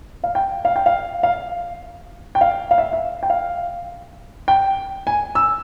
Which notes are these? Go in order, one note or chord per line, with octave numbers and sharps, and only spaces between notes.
F5
G5
F5
G5
F5
F5
G5
F5
F5
E5
E5
G5
F5
G5
G#5
E6